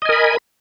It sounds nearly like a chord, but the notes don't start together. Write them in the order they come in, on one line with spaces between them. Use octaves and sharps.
D#5 G#5 A#4 B5